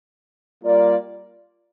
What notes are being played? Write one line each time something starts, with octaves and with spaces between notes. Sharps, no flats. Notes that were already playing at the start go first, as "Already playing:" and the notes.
G3 A#3 F4 A#4 D5